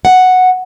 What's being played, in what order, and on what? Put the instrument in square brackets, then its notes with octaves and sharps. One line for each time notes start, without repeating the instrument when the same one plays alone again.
[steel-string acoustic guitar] F#5